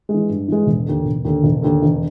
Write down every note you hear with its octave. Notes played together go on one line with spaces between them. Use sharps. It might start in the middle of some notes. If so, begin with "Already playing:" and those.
G#3
E3
G2
E3 G#3
E1
D#2 D3
E1
D#2 D3
E1
D#2 D3
E1